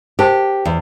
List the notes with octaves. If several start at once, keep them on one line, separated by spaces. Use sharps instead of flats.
G4 A#4 C5 A5
E2